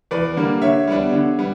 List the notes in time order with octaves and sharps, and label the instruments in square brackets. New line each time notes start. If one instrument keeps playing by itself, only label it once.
[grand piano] E2 B4 D5
D3 G3 A#3
D3 C#5 E5
G3 B3 D4
D3
G3 B3